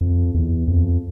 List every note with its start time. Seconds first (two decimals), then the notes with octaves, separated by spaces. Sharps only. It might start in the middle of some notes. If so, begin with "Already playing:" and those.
0.01 F2
0.34 E2
0.68 F2